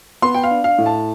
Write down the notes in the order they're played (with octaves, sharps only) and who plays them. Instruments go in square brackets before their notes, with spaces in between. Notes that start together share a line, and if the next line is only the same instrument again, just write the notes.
[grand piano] B3 C6
G5
F5
D4
F5
A2
A5